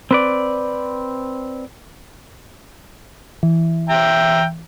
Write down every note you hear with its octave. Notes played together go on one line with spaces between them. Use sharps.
C4 B4 D5
E3
E5 G5 A#5